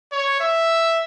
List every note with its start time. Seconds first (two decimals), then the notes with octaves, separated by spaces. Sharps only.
0.12 C#5
0.40 E5